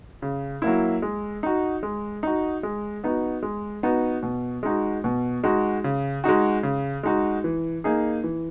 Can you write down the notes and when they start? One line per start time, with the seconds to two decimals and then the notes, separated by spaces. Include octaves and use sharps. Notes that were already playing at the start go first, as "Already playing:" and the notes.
0.22 C#3
0.62 F#3 A#3 E4
1.02 G#3
1.43 D#4 F#4
1.83 G#3
2.23 D#4 F#4
2.63 G#3
3.04 B3 D#4 F#4
3.42 G#3
3.83 B3 D#4 F#4
4.23 B2
4.63 G#3 D#4 F#4
5.04 B2
5.44 G#3 D#4 F#4
5.84 C#3
6.24 G#3 D#4 F#4
6.63 C#3
7.03 G#3 D#4 F#4
7.44 E3
7.84 A#3 D#4 G#4
8.24 E3